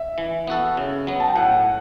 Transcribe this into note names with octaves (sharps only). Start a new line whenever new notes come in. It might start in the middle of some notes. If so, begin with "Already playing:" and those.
Already playing: E5
E3
B3 F#4 A4
C#3
F#3 B3
A5
G5
A2 F#5